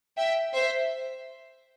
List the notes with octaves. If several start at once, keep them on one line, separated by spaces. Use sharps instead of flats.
E5 G5
C5 E5